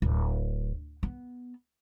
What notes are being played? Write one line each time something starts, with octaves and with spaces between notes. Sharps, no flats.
D1
B3